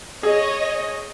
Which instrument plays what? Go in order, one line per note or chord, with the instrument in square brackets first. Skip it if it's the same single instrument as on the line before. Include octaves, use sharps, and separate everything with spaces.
[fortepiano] G#4 [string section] C#5 D#5